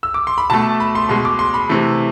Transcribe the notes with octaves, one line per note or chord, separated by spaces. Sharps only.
E6
D6
C6
B5
B2 A3 A5
B5
C6
B2 G#3 C6
D6
C6
B5
C3 E3 A3